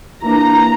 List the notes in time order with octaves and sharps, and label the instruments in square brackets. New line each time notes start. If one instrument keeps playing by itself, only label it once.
[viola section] E3 A#3 D4 A#5